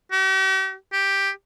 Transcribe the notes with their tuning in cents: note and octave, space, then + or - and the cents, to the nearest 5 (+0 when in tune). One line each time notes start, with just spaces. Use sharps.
G4 -45
G4 +5